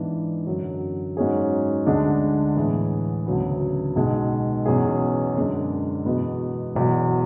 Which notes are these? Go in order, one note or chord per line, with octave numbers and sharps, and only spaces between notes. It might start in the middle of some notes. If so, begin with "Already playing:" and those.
Already playing: G#2 E3 B3 D4
F#2 D3 F#3
G#2 F#3 C#4 G#4
D2 D3 G#3 D4
A2 E3 B3 E4 G#4
D2 C#3 F#3 B3
B1 B2 G#3
E2 B2 F#3 C#4 G#4
F#2 D3 G#3 D4
E2 B2 G#3 B3 F#4
E1 E2 B2 F#3